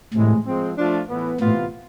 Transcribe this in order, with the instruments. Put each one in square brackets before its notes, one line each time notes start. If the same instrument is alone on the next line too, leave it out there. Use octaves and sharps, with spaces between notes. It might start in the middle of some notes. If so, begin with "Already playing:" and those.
[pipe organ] A2 [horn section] C3 E3 G#3
[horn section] F3 G#3 C4
F3 A3 D4 F4
A2 E3 B3
[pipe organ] A2 [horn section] C3 E3 B3 F4